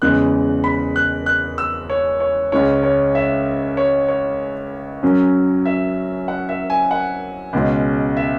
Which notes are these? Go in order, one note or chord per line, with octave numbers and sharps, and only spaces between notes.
E2 C#3 G#3 B3 F#6
B5
F#6
F#6
E6
C#5
C#5
C#2 C#3 G#3 C#4 C#5
C#5
E5
C#5
C#5
F#2 F#3 C#4
E5
F#5
E5
G#5
F#5
C#2 B2 G#3 C#4
E5